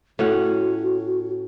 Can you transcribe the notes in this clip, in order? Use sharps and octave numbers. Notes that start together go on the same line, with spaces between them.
A2 C#4 F#4 F#5